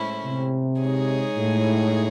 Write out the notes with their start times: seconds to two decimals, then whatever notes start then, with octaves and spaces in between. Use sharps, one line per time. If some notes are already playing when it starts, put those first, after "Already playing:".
Already playing: A2 G#3 C#4 E4 C5
0.25 C3
0.81 G#3 D#4 G#4 C#5
1.37 A2